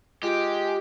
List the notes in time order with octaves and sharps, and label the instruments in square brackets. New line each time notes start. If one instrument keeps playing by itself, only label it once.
[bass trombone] G#3 [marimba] F4 [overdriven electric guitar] G4